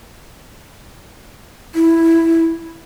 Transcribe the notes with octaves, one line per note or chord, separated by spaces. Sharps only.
E4